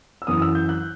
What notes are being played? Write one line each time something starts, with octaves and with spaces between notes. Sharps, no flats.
E6
F#2 E3 D#6
E6
G6
F#6